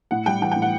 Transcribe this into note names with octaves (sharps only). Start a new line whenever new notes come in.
A2 F#5
G3 G5
E3 G5
A2 G5
F#5